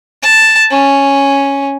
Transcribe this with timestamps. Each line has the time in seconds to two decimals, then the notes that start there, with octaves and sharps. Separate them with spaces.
0.23 A5
0.71 C#4